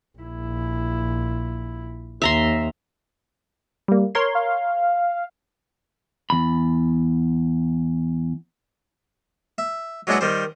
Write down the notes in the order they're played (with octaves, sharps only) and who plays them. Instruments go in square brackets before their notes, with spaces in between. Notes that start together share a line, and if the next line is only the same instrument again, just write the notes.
[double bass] A#1 E4
[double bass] D#2 [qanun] E5 A#5 C6
[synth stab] G3 A#3
A#4 C#5 C6
[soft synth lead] F5
[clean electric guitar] E2 B5
[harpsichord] E5
F#3 G#3 D4 E4 B4 F#5
D#3 G3 C5